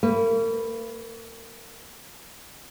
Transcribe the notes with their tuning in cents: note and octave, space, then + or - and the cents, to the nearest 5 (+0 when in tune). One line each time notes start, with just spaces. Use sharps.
A#3 -40 B4 +0